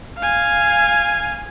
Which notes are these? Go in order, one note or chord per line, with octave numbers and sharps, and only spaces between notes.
F5 G#5